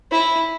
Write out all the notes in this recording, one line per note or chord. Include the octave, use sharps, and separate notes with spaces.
E4